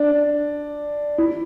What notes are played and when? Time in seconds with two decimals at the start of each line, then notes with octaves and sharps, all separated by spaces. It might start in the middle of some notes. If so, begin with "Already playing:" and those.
Already playing: D4
1.18 E4